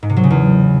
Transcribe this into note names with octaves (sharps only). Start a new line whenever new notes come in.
G#2
C3
F#3
C#3
E2